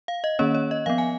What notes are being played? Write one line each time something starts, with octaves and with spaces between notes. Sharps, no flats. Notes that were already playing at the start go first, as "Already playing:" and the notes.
F5
D#5
D#3 A#3 C#4 C#5
C#5
D#5
F3 B3 F5
G#5